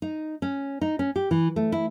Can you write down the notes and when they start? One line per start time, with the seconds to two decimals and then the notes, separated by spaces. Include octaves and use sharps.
0.02 D#4
0.42 C#4
0.81 D#4
0.99 C#4
1.16 G4
1.31 E3
1.56 A3
1.72 E4